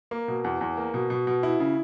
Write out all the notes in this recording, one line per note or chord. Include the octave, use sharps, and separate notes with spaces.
A#3
B2
E2
E2
A#3
B2
B2
B2
E4
C#3